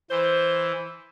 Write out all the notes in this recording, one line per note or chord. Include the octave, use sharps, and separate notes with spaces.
E3 C5